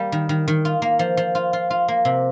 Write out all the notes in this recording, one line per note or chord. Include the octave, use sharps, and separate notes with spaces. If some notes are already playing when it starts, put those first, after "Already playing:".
Already playing: G3 A#3
D#3
D#3
D#3
F4
A#3
F3
F3
F4
F4
F4
A#3
C3